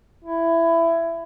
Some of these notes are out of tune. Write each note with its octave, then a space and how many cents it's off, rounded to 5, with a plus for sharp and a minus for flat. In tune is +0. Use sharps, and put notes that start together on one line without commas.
E4 +15